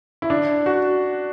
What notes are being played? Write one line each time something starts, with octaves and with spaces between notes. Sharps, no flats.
E4
D4
F#4